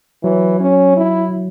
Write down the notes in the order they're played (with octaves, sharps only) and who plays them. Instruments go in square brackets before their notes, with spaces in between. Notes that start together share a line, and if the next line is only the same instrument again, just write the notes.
[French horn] E3 [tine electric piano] F#3
[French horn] C#4
E4